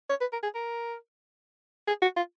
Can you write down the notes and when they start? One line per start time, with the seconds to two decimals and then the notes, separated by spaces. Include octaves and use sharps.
0.10 C#5
0.21 B4
0.32 A#4
0.43 G#4
0.55 A#4
1.88 G#4
2.02 F#4
2.17 F4